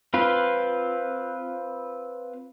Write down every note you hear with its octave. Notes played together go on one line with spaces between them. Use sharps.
C4 F4 B4 F5